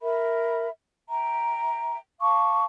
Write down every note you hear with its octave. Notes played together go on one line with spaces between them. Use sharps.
A#4 E5 B5
E5 G5 A#5
F5 A5 C#6 D6